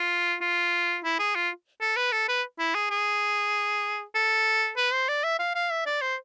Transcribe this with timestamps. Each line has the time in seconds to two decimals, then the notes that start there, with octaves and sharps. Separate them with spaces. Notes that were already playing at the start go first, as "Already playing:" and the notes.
Already playing: F4
0.41 F4
1.04 E4
1.19 G#4
1.35 F4
1.81 A4
1.96 B4
2.12 A4
2.28 B4
2.59 E4
2.75 G#4
2.90 G#4
4.15 A4
4.77 B4
4.93 C5
5.09 D5
5.24 E5
5.39 F5
5.55 F5
5.71 E5
5.86 D5
6.01 C5